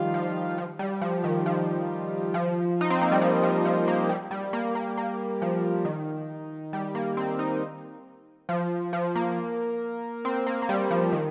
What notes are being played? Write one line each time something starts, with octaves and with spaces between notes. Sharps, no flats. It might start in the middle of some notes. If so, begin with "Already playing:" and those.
Already playing: D#3 F3 G3 F4
F3
F3
G3
F3
D#3
F3
F3
D#4
C4
A#3
G3
F3
F3
F3
A#3
G3
G3
A#3
A#3
A#3
F3
D#3
G3
A#3
C4
D#4
F3
F3
A#3
C4
A#3
A#3
G3
F3
D#3